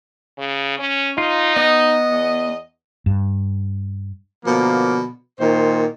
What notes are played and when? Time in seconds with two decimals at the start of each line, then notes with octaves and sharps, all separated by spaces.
0.38 C#3
0.79 C#4
1.18 D#4 F4
1.56 B3 D#5
2.10 E2
3.06 G2
4.45 B2 D3 F3 A#3
5.39 A#2 D#3 C5